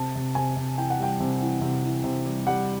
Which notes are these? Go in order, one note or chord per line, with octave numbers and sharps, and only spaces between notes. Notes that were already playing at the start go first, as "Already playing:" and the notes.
Already playing: C3 A5
C3
C3 G#5
C3
E3 G5
F#5
G3 G5
C3
E3
C3
E3
C3
G3
G3 F#5